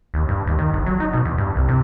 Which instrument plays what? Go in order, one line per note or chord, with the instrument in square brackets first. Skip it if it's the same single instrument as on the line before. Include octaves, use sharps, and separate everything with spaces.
[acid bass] D#2
G2
D#2
D#3
G1
F#3
D#4
B2
E2
G2
C2
C3